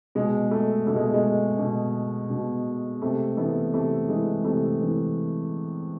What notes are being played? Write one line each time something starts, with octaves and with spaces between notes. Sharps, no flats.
B2 G#3
A3
B2 A3
G#3
G#3
B2
B2
C3 A3
E3 A3 B3
C3 A3
E3 G#3
C3 A3
E3